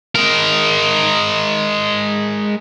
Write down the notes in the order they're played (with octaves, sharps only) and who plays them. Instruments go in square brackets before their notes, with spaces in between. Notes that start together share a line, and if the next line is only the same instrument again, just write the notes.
[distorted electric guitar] G#3 A#4